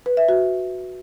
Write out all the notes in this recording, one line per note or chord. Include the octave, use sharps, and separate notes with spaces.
B4
E5
F#4